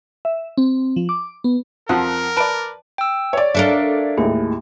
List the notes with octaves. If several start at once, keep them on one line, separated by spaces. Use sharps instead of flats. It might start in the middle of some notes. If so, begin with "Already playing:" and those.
E5
C4
F3
D6
B3
F2 F3 A#4 F#5 A5
B4 D5 A5 D7
G5 E6
C#5 D5
D4 A4 A#4 E5 F5
D#2 A2 G#3 E4